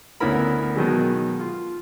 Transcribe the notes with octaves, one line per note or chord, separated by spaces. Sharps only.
D2 B3 C#4 E4 A#4 B5
B2 D#3 F#3 G#3
F4